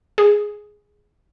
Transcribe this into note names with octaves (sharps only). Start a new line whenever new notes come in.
G#4